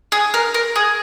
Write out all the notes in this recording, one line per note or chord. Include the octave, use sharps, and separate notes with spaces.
G#4
A#4
A#4
G#4